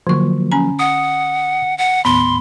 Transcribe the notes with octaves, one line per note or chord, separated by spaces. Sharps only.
D3 F3 F#3 A#3 C#6
C#4 G#5 A#5
F#5 D#6
F#5
D#2 A2 B3 B5 C6